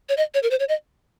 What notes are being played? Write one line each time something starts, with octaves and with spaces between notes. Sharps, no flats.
C#5
D#5
C#5
A#4
C5
C#5
D#5